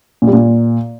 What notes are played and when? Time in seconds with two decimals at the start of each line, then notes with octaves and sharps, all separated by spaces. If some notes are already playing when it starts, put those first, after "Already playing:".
0.22 A#2
0.27 G3
0.33 A#2